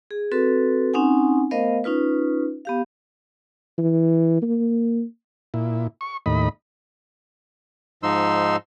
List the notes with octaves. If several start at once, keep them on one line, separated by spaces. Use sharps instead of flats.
G#4
C4 F#4 A4 B4
C4 C#4 D#4 F#5 G#5
A3 B3 A#4 C5 D#5 F5
C#4 D#4 F4 B4
B3 G4 F5
E3
A#3
A#2 E4
C#6
D#2 A2 D#5 B5
G#2 F3 D#4 C6 E6